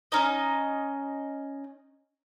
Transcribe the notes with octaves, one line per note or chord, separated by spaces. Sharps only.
C#4 D#4 D#5